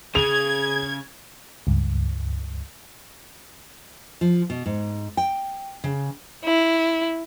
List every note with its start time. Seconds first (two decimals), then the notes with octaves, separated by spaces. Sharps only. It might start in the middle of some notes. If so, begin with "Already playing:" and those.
0.15 C#3 G#4 G#6 F7
1.67 C#2 G2
4.21 F3
4.50 B2
4.66 G#2
5.17 G5
5.84 C#3
6.45 E4